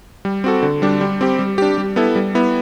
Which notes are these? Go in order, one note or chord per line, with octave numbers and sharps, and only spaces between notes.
G3
C4 F#4 A4
D3
G3 D4 G4
G3
C4 G4
G3
D4 G4
G3
B3 E4 A4
G3
B3 E4